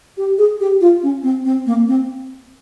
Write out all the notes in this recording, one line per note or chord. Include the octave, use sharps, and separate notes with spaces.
G4
G#4
G4
F4
C#4
C4
C4
A#3
C4